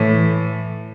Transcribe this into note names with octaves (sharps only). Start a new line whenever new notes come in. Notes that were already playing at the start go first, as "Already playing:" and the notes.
Already playing: A2 E3